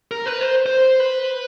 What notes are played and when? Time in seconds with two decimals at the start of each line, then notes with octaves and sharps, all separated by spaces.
0.11 A#4
0.26 B4
0.41 C5
0.66 C5
1.00 B4